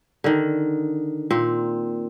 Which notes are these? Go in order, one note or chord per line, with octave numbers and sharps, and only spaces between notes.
D3 D#3
A#2 C4